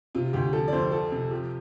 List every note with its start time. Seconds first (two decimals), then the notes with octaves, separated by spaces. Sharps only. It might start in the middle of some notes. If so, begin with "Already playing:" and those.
0.15 C3 F4
0.33 D2 G4
0.53 F3 A4
0.68 D5
0.73 F2 C5
0.92 F3 A4
1.12 C3
1.31 F3 G4